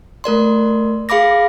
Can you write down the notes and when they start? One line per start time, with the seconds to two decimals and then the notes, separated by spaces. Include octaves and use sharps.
0.24 A3 A#4 D5 C6
1.09 G#4 F5 B5 D6 A#6